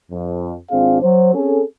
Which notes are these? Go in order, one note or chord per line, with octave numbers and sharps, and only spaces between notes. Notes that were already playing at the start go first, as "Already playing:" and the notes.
F2
G#1 C4 D4 F4 G#4 F5
F#3 C5
C4 C#4 G#4 A4